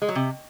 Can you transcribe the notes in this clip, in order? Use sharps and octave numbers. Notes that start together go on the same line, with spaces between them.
G#3
F#3
C3